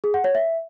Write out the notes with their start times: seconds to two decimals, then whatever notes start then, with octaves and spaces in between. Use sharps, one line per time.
0.04 G#4
0.14 F#5
0.24 C#5
0.35 E5